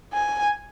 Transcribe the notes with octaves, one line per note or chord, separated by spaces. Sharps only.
G#5